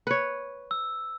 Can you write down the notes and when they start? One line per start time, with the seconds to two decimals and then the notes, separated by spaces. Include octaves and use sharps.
0.07 B4 C#5
0.71 E6